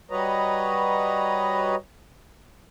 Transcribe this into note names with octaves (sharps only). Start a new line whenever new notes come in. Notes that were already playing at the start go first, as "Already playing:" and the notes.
G3 F#4 B4 C#5 D#5 A#5